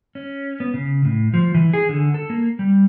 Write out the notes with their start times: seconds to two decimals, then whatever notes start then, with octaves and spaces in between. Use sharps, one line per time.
0.15 C#4
0.60 B3
0.74 C#3
1.05 A2
1.34 F3
1.55 E3
1.73 G#4
1.89 D3
2.14 A4
2.30 A#3
2.59 G3